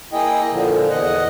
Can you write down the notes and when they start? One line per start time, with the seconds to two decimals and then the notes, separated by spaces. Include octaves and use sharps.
0.13 A#3 E4 G#4 D#5 G5
0.52 A#2 D3 F3
0.90 E2 D#5 F#5